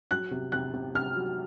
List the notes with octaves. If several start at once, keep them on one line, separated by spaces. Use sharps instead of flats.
F#3 F#6
C3
C3 F#6
C3
C3 F6
F#3